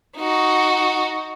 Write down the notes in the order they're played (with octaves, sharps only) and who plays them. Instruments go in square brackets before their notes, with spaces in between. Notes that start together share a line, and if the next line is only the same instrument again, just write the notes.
[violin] D#4 F#4